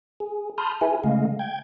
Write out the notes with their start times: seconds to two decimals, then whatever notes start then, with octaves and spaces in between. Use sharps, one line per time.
0.20 G#4
0.58 A5 B5 C6 D#6 F6 G6
0.81 E4 G#4 B4 E5 G#5
1.04 C#3 G#3 A3 D#5 F5
1.39 G5 G6 G#6